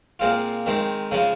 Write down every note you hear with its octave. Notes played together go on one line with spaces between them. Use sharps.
A#2 G#3 C4 F4
D#3 G#3 C4
C#3 F3 G#3